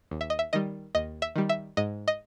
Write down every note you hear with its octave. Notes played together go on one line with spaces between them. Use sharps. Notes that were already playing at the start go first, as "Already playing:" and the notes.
D#2
E5
D#5
E5
D#3 G3 D#5
D#2 D#5
E5
D#3 G3
E5
G#2 D#5
D#5